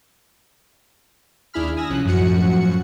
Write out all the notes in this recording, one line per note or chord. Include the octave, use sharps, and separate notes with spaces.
D#2 D4 E4 G#4 B5 F6
G#5 D#6 E6 A#6
C2 F3 C#4 F#6
F#2 A2 F3 F#4 F#5 C#7